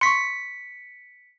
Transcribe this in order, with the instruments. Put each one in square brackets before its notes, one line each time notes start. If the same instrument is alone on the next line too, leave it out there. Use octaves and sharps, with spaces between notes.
[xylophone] C6 C#6 [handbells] B6 C#7